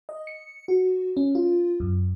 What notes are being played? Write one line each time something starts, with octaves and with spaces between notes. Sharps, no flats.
D#5
C#7
F#4
C#4
F4
F#2